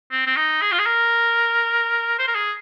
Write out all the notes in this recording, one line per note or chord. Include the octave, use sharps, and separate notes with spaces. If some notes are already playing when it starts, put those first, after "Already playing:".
C4
C4
D#4
G#4
F4
G#4
A#4
C5
A#4
G#4